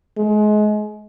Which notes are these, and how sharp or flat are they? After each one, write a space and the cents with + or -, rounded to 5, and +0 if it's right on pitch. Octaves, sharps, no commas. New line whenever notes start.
G#3 +30